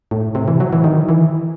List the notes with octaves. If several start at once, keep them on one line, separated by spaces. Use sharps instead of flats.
A2
C3
E3
F#3
E3
D#3
E3